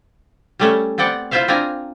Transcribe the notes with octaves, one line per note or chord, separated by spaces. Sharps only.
G3 A3 C#4
B3 C4 D5 F#5 G5
E4 F4 B4 C5 E5 F5
C4 D4 F4 G5 G#5 A#5